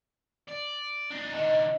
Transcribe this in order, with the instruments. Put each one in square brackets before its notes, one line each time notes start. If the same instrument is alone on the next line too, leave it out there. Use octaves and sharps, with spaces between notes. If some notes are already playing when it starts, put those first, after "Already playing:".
[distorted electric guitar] D5
D4 D#4
[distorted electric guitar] D#3 D4 [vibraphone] D#5